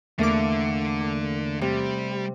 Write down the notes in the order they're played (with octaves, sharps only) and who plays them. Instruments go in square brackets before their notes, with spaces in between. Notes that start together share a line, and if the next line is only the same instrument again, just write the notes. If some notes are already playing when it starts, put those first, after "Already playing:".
[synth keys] E2 A#3 D6 [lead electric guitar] D3 [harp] A3
[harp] C3 [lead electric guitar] G3